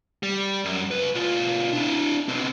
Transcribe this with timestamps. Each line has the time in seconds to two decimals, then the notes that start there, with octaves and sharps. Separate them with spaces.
0.23 G3
0.65 F#2
0.91 C#2 B4
1.15 B2 F4
1.73 D4 E4
2.28 B2 C4